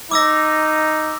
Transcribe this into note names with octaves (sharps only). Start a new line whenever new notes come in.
D#4 D6 E6 A#6